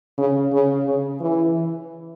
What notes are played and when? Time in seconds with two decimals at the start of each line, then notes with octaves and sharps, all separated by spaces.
0.18 C#3
0.52 C#3
0.86 C#3
1.20 E3